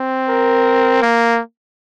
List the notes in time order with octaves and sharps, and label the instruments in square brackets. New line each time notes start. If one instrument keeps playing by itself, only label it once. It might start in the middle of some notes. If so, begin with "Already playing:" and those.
Already playing: [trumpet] C4
[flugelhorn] A#4
[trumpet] A#3